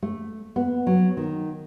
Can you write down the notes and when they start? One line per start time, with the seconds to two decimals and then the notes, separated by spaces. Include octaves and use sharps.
0.03 A3
0.56 B3
0.87 F#3
1.17 D#3